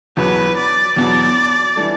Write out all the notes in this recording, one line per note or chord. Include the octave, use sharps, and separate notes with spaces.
E2 B2 F#3 B4
D5
E2 B2 F#3 D5
E3 G3 D4 A4